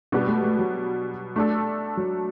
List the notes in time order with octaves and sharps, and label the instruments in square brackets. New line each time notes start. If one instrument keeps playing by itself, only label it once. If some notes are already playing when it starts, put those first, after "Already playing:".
[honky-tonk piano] B2 G3 D4 G4 B4 [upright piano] B3
[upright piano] A3
A3
F#3
[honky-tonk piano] A3 D4 A4
[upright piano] F#3